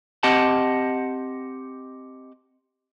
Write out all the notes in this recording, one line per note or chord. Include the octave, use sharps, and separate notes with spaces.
C4 G4 D#5 F#5 A5